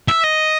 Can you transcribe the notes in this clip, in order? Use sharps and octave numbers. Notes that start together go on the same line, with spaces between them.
E5
D#5